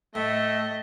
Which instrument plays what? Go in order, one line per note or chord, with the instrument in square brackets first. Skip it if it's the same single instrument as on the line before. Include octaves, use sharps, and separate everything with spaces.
[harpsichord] A2 [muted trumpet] A3 [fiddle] D#5 [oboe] E5